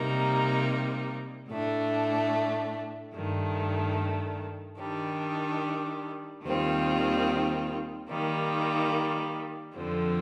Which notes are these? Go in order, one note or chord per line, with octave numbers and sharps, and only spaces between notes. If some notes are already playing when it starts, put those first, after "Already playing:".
Already playing: C3 G3 A#3 D#4
A2 A3 D4
G2 D#3 A3
D#3 G3 D4
D#2 D#3 G3 C4 F4
D#3 G3 A#3
F2 D3 F3 C4